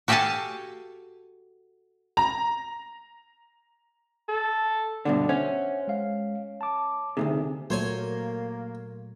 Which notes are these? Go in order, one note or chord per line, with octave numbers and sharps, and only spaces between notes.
F#4 G4 A4 F5 G#5 A5
A#5
A4
G2 B2 D3 D5 F#5
C#4 C5 E5 F#5
G#3 F5
A5 D6
D2 G#2 C3 A3 D#4 G#4
A#2 F#3 A3 A#3 C5 C#5 G#5